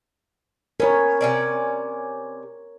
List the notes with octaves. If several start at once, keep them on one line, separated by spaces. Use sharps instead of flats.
B3 C#4 A#4 C#5
C3 C#4 D5